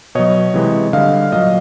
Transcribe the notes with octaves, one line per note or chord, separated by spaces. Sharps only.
B2 F#3 C#5 D#5
C3 E3 G#3
D3 G3 D#5 F5
A#2 F#3 D#5 F5